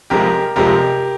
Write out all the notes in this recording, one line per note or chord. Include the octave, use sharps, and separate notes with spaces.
F1 F2 C3 F3 G#3 G4 A#4
F1 F2 C3 F3 G#3 G4 A#4